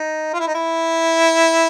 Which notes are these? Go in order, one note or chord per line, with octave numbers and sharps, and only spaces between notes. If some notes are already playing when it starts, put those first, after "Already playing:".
Already playing: D#4
F4
E4
D#4
E4